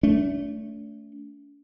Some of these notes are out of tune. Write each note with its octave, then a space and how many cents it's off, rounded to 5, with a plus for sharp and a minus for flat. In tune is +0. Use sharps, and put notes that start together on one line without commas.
A3 +0 D4 -45